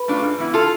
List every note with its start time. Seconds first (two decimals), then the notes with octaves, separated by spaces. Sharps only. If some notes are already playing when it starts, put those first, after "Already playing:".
Already playing: B4
0.08 A3 D4 F4
0.22 G#2
0.38 E3 B3 E4
0.54 F4 A4